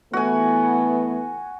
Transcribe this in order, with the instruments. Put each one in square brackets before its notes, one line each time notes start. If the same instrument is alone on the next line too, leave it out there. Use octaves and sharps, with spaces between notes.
[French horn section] E3 A3 B3 [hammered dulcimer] F#4 G#5